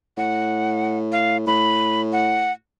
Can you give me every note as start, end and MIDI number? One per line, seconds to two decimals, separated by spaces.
0.17 1.47 45
0.17 0.98 78
1.12 1.37 77
1.47 2.54 45
1.47 2.01 83
2.13 2.52 78